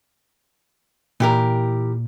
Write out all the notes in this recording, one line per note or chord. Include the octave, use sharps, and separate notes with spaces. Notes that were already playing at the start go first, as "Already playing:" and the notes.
A#2 E3 G4 A#4